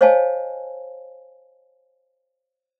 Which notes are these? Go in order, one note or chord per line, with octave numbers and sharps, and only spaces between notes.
C5 C#5 D#5 F5 G#5 A5